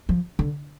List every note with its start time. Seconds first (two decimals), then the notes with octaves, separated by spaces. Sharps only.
0.09 F3
0.39 D3